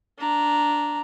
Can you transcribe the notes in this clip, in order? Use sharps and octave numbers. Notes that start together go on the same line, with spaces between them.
D4 A#5